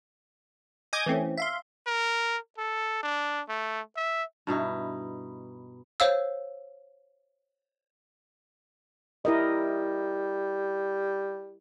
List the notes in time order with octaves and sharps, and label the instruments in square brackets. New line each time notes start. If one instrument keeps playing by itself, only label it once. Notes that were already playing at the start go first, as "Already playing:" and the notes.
[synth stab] D#5 G#5 D6 D#6 G6 G#6
E3 A3 C4 C#4
E5 F5 C6
[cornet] A#4
A4
D4
A3
E5
[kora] G2 B2 D#4 E4
[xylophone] C5 C#5 F5 E6
[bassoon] G3 [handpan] E4 A#4 D#5